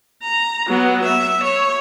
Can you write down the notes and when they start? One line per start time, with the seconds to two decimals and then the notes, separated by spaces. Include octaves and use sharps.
0.23 A#5
0.68 F#3 B3
1.05 E5
1.43 C#5